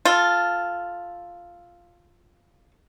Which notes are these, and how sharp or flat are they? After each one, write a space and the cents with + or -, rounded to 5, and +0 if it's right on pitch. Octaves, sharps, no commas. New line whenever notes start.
F4 +0 A4 +0